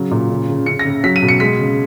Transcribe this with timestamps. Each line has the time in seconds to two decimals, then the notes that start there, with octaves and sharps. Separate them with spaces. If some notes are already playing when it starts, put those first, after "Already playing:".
Already playing: C#3 F#3
0.11 A#2
0.30 C#3
0.48 C#3
0.66 C#3 C#7
0.79 A#6
0.85 C#3
1.04 F#3 B6
1.16 D#7
1.23 B2
1.28 C#7
1.40 G#3 B6
1.59 C#3